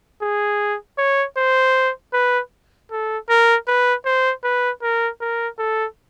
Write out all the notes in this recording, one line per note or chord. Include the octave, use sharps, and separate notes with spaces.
G#4
C#5
C5
B4
A4
A#4
B4
C5
B4
A#4
A#4
A4